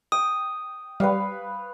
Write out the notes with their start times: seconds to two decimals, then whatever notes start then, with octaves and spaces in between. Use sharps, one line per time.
0.12 G5 D#6
1.00 G3 B4 C#5 F5